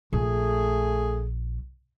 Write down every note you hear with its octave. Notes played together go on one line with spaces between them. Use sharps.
A#1 A3 G#4